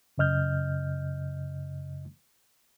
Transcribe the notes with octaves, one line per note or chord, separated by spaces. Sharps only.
F#2 C#3 D#5 F6 G6